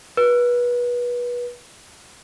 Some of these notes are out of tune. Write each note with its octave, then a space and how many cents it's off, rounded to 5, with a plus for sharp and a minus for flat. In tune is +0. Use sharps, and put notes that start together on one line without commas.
B4 -25